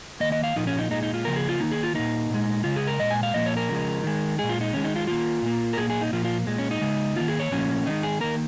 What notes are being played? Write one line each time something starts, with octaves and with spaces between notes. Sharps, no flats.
D#3 A#3 D#5
D#5
F5
A#2 F3 A#3 D#4
C#4
D#4
A#2 G#3 D#4
D#4
F4
C#3 F3 A#3 A#4
G#4
F4
D#3 A#3 D#4
G#4
F4
A#2 A#3 D#4
A#2 G#3
C#3 G#3 F4
G#4
A#4
A#2 G#3 D#5
G#5
F5
A#2 F3 A#3 D#5
C#5
A#4
C#3 F3 G#3
D#3 G#3
A#2 G#3 G#4
F4
D#4
D#3 G#3 C#4
D#4
F4
D#3 A#3 F4
A#2 A#3
A#4
A#2 A#3 G#4
G#4
D#4
A#2 F3 A#3 F4
F4
A#2 G#3
C#4
D#4
C#3 G#3
D#3 A#3 F4
G#4
C#5
A#2 F3 A#3 C#4
D#3 G#3 D#4
G#4
D#3 A#3 A#4